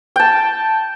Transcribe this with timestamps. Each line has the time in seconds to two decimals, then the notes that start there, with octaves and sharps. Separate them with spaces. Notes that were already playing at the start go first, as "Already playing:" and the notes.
0.16 G5 A5